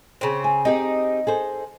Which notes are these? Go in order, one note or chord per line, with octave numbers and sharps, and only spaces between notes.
C#3 C4
G#5
C4 D#4 G4 G#4
G#4 A4 C5